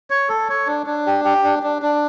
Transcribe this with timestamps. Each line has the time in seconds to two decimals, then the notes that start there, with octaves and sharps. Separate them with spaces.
0.10 C#5
0.29 A4
0.49 C#5
0.67 D4
0.86 D4
1.07 G4
1.25 G4
1.44 D4
1.63 D4
1.82 D4